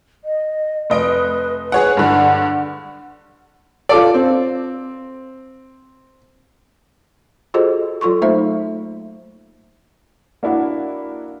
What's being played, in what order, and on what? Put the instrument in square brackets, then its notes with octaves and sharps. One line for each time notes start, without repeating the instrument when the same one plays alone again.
[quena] D#5
[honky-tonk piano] F1 D#5 D7 [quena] B4
[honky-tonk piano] G#4 C#5 F#5 [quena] B4
[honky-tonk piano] G2 D3 [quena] F#5
[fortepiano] F4 A4 D5
C4
[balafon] F4 F#4 G#4 A4 C5 D#5
F#3 F4 A4 C6 C#6
A3 A#3 D#4 C5 E5
[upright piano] A#3 D4 E4 F#4